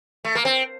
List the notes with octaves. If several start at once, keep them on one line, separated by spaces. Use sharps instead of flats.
A3
A#3
C4